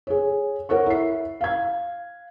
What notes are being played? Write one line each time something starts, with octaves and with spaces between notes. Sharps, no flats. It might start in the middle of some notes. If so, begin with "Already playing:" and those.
G#4 C#5
A#4 C#5 F#5 C#6
E4 C7
F5 G#6